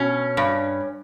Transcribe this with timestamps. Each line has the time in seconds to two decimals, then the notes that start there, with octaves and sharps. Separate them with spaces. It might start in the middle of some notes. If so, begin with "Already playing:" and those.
Already playing: B2 C#4
0.37 G2